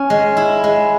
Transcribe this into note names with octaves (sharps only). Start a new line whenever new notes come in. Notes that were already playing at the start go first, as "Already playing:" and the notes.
Already playing: C#4
G#3
E4
G#3